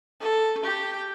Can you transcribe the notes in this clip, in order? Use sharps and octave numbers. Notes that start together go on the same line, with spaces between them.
A4
G4 G5